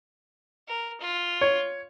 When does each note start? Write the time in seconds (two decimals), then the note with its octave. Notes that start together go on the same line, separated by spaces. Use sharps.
0.68 A#4
1.01 F4
1.41 C#5